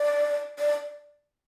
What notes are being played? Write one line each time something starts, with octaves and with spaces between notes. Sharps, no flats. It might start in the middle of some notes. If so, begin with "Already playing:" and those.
Already playing: D5
D5